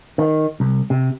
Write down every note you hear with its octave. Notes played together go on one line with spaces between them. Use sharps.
D#3
C2
C3